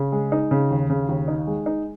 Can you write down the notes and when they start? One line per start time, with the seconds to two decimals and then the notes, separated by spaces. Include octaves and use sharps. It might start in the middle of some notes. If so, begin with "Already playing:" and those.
Already playing: C#3
0.12 G#3
0.32 D#4
0.51 C#3
0.71 D#2
0.90 C#3
1.09 D#2
1.28 D#4
1.47 G#3
1.66 D#4